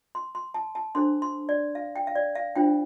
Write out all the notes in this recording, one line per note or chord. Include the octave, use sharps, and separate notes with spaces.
C6
C6
A5
A5
D4 A4 C5 C6
C6
D5
F5
G5
F5
D5
F5
D4 F4 C5 G5